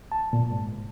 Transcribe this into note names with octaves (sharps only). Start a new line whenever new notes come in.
A5
A#2
G#2